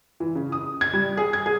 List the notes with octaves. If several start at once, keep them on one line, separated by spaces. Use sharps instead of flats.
E3
C#3
D#6
G#6
G3
G#4
G#6
G#4